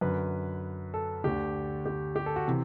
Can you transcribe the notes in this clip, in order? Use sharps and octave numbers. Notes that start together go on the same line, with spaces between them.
F#2 D3 B4
A4
D2 D3 G4
G4
G4
A4
F#4
C3 E3